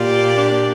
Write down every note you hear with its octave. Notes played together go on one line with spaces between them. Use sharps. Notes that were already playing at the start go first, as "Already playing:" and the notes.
Already playing: A#2 A#3 F4 G4 D5
D4